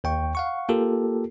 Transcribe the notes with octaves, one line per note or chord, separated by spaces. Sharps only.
D#2 G5 C#6
F5 F#5 C#6
A#3 F4 G4 A4 A#4